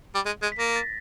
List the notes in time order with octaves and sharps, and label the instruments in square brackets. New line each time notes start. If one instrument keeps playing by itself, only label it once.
[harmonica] G3
G#3
G#3
[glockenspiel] B6
[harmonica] A#3 [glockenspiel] A#6
[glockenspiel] A6